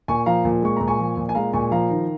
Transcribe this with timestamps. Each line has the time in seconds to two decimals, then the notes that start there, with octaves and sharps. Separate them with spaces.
0.08 A#2 G#5 C#6
0.26 F3 F5 A#5
0.45 A#2
0.62 G#3 C#6
0.77 A#2 A#5
0.88 G#5 C#6
0.99 F3
1.17 A#2
1.29 G#5
1.35 G#3 F5 A#5
1.54 A#2 G#5 C#6
1.71 F3 F5 A#5
1.90 D#3